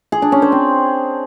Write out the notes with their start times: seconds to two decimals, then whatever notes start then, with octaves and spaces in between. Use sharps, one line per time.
0.12 G#4
0.22 D4
0.32 C#4
0.42 C5
0.52 C4